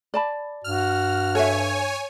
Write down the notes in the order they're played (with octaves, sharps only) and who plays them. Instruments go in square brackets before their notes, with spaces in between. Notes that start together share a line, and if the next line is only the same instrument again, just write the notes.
[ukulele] D5 A5 B5
[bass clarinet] G2 [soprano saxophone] F#4 [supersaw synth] F6
[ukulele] A4 E5 [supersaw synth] C#5 G#5